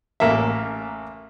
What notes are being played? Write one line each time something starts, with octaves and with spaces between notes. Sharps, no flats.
A1 A#3 E5